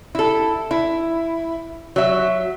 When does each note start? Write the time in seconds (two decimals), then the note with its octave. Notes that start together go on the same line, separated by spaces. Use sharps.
0.15 E4 A4
0.71 E4
1.96 F#3 E5